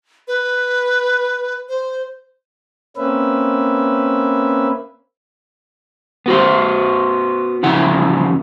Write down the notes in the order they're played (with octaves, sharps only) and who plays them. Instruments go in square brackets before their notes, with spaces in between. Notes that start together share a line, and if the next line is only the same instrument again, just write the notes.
[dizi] B4
C5
[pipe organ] A#3 C4 C#4 B4 E5
[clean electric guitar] B3 F#4 C5
E2 C#3 F3 F#5